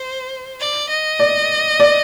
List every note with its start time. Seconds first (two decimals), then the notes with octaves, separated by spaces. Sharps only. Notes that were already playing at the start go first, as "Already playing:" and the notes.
Already playing: C5
0.60 D5
0.90 D#5
1.19 D5
1.80 D5